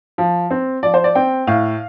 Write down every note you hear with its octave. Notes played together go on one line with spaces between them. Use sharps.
F3
C4
F3 D5
C5
D5
C4 G5
A2 F5